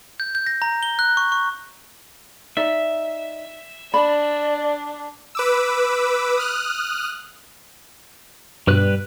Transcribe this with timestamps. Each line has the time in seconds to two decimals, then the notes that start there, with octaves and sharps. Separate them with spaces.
0.20 G6
0.35 G6
0.47 A#6
0.62 A#5
0.83 G7
0.99 F#6
1.17 C#6
1.32 C#6
2.57 D#4 D5 E5
3.94 D4 D5 B5
5.35 B4 D6 E6
6.37 D#6 F6 F#6
8.67 G2 B2 G3 B4 F#6